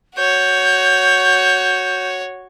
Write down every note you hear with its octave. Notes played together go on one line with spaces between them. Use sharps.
F#4 C#5 G6